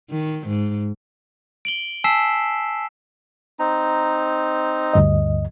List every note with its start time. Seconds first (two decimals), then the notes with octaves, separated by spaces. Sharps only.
0.10 D#3
0.48 G#2
1.65 D7 F#7 G7
2.04 G#5 A5 E6 B6 C7 E7
3.59 C4 D#4 A#5
4.93 D2 G2 D#5